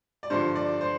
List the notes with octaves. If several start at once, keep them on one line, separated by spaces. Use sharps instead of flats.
D5
G2 D3 F3 C5
D5
C5